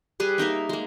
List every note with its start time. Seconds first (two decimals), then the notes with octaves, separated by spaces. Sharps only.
0.20 G3 G#4 B4
0.38 A#3 D#4 A#4 E5
0.69 G#3 A#3